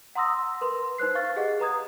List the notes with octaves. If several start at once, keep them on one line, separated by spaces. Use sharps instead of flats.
F#5 A#5 C6 D#6 E6 A#6
A#4 B4 C6
D#4 B4 C5 F#6 C7
F5 C#6 F6 A6
G4 G#4 D#5 F#5
B4 A#5 D#6 G#6